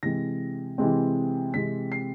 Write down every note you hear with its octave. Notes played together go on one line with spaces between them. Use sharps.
C3 E3 G#3 C4 A#6
C3 E3 G#3 C4
C3 E3 G#3 C4 B6
C7